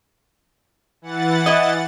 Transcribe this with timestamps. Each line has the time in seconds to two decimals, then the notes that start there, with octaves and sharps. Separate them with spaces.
1.02 E3 F#5 A6
1.46 E4 D#5